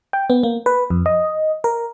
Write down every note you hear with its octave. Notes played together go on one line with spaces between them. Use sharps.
G5
B3
A#3
B4
F2
D#5
A#4